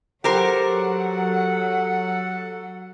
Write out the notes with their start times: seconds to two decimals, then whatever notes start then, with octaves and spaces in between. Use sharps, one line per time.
0.24 F#3 G4 A4 A#4 C5 F#5